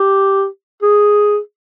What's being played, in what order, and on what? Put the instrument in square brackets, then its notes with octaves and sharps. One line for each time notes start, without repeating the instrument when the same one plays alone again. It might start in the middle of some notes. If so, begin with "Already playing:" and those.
Already playing: [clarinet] G4
G#4